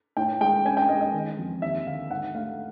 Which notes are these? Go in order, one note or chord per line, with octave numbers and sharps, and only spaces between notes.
A2 G5
G#3 G5
C#4 G#5
G5
G#3 D#5
D#5
D#3
F2
D#2 E5
D3 F5
G#2 F#5
A3 F5